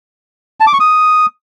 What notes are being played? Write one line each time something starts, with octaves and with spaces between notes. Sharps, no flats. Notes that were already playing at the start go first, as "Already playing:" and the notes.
A5
D6
C#6
D#6